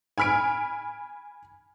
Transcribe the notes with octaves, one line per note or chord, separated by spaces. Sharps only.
G#5 B5 F6 B6 D7